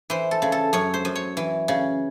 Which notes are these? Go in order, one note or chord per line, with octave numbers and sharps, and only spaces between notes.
E3 C5
A4
C#3
A4
F#2 C#5
C5
F#2
C#5
E3
C#3